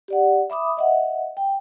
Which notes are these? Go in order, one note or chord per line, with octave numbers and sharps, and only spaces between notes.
G4 D5 F#5
E5 B5 D6 D#6
D#5 E5 F#5
G5